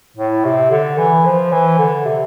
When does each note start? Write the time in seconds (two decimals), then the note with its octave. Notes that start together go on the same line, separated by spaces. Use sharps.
0.17 A2
0.45 C3
0.71 D3
0.98 E3
1.25 F3
1.52 E3
1.79 D3
2.05 C3